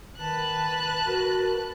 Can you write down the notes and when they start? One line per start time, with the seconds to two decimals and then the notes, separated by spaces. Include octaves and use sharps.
0.18 D#3 B4 A5 F#6
1.05 F#4 A#4